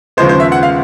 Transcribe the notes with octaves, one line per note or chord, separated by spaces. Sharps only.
D#2 C#3 F3 G#3 B3 C5
C5
E5
F#5
F5